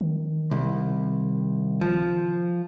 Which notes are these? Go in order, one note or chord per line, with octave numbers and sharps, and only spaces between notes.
D#3
C2
F3